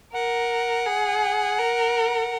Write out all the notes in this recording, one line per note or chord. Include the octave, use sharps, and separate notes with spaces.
A#4 F#5
G#4
A#4